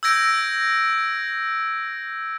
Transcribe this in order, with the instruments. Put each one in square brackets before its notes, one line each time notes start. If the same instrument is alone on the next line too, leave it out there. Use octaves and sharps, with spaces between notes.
[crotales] E6 G6 G#6 A#6 D7